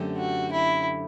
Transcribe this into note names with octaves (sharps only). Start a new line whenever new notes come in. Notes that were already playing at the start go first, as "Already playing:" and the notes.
Already playing: F#2 D3 A3 C4 G4
F#4
E4